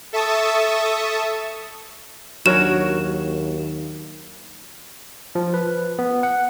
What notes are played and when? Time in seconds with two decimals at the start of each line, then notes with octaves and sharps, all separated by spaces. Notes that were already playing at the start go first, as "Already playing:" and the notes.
0.13 A4 E5 A5 C#6 D#6
2.46 D#2 F#3 D4 F#4 A#4 C#5 E7
5.35 F3
5.54 B4
5.99 B3
6.23 F#5